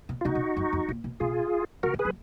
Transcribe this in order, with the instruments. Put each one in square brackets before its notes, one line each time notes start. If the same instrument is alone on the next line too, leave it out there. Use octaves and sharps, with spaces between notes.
[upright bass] B2
[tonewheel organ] F4
[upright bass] B2 [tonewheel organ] D#4 F#4
[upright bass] B2
F#2
F2
A#2
B2
[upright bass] B2 [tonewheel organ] F4 G#4
[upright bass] C#3 [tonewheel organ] F#4 A#4
[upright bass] D#3
[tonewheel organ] G#4 B4
[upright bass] F#3